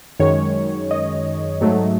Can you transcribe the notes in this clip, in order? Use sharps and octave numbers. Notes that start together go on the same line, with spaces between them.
F#2 D#3 G#3 C#5
D#5
G#2 F#3 A3